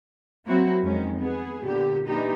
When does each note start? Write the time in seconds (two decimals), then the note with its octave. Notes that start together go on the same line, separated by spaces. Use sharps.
0.46 F#3 A#3 C4 E4 F#4
0.83 F2 D#3 G#3 C#4
1.19 B3 G#4
1.63 A#2 D3 G4
2.05 E3 A#3 D4 D#4 G4